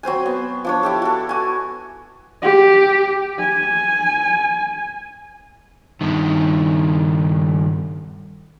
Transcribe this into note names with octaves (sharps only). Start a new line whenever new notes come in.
F#3 C4 C5 G#5
B3
F3 D4 C#5
E4 G4 A4
F#4 A4
F#4 G#5
G4
G#5
G2 D#3